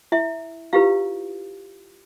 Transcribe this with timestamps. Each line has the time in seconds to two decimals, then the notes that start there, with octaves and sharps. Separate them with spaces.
0.12 E4 E5
0.73 E4 F4 G4 B4 F5